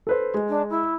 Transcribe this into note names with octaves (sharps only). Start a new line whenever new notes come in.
A4 B4 C5
G#3
D4
E4